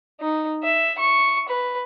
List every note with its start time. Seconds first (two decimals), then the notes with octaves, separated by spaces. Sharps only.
0.20 D#4
0.63 E5
0.99 C#6
1.48 B4